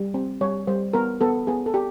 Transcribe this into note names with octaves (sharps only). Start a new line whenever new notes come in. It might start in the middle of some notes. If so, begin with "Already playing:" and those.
Already playing: G3
C4
G3 C#5
G3 C5
B3 A#4
B3 A4
B3 G#4
A4
G4